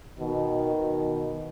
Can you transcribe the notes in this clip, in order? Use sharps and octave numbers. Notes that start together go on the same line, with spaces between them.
B2 D#3
B2